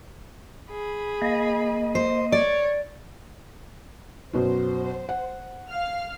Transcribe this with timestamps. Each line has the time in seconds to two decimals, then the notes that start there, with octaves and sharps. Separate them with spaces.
0.70 G#4 B5
1.22 A#3 D#5
1.95 C5
2.32 C#5 D5
4.33 F#2 B2 F#3 C5
5.09 F#5
5.70 F5 F6